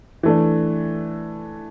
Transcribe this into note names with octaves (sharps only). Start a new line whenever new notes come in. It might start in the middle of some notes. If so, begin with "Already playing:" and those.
E3 A3 D4